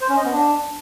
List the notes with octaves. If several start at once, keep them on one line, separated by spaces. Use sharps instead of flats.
C5
C#4
D#5
B3
D4